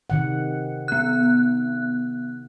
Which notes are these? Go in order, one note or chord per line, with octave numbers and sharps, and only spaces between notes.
C3 D#3 F#5
B3 F#6